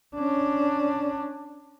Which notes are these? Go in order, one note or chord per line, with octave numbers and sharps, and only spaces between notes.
C#4 D4